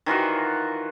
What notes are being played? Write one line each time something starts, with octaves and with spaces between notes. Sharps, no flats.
D#3 E3 F4 F#4